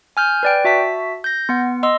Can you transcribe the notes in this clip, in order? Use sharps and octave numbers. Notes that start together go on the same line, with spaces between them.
G#5 F6 G6
B4 D5 G5
F#4 E5 A5 B6
G6 A#6
B3 F#5
D#5 C6 E6